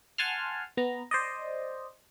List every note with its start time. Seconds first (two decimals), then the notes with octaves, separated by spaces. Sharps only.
0.18 F#5 G#5 A5 C6 F6
0.77 B3 A#5
1.11 C5 D5 D#5